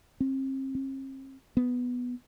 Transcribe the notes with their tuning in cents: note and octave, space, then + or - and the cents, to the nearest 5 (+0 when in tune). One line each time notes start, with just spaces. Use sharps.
C4 +40
C4 +45
B3 +0